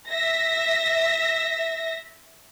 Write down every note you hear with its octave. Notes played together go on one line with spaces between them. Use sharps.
E5 A#6